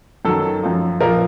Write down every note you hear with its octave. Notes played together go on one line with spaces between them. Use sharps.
F#2 D#3 F#3 A4
F#2 F3
A#2 F3 A#4